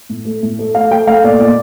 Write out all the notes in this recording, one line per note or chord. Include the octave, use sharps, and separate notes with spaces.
A2
A3
A2
A3
A3 F5
A3 G5
A3 F5
A#2 D5
A#2 D5